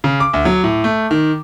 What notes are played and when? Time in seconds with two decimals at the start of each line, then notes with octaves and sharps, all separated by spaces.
0.04 C#3
0.20 D6
0.33 D2
0.45 F#3
0.64 A2
0.84 A3
1.11 D#3